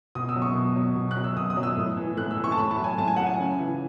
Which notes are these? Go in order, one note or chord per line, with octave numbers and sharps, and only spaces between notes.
B2 D#6
E6
F#3
C#6
B2
F#3
B2
F#6
F#3
E6
B2 D#6
D#6
F#3
E6
A2
E3
A2 F#6
E6
E3
C#6
A5
A2 B5
A5
F#3
G#5
A2 A5
G#5
F#3 F#5
G#5
C#3
E3